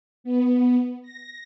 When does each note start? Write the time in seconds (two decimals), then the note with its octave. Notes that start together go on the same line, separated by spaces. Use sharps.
0.24 B3
1.02 A#6